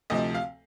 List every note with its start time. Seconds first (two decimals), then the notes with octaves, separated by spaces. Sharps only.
0.10 D2 C3 F3 D#5
0.35 F5